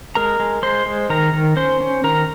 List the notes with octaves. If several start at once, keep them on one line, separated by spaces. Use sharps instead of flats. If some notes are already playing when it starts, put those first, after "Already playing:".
G#3 A#4 A#5
G#3
G#3 C5 C6
G#3
D#3 A#4 A#5
D#3
C#4 C5 C6
C#4
D#3 A#4 A#5